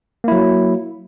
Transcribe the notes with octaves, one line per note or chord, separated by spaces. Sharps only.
F#3 A#3 E4